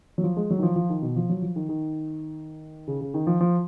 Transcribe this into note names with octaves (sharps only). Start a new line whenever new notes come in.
F#3
F3
G#3
F#3
D#3
F3
F3
D#3
B2
F3
F#3
F3
D#3
D#3
C#3
C#3
D#3
F3
F3